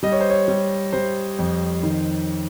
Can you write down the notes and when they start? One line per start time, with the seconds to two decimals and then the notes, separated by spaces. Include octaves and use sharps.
0.03 G3 D#5
0.12 C#5
0.20 C5
0.30 C#5
0.48 G3
0.93 G3 C5
1.39 F2
1.83 D#3